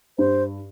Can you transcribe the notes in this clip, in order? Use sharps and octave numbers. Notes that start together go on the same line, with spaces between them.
G2 C5